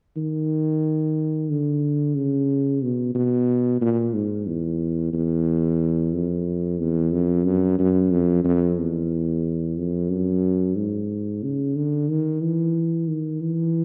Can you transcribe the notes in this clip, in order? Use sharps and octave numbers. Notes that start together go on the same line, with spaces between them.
D#3
D3
C#3
B2
B2
A#2
G#2
E2
E2
F2
E2
F2
F#2
F#2
F2
F2
E2
F2
F#2
G#2
C#3
D3
D#3
E3
D#3
E3